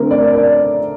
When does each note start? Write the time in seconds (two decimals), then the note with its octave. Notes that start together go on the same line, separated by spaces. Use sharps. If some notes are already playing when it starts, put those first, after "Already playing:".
Already playing: D3 A3 C4 A#4
0.11 D5
0.35 D5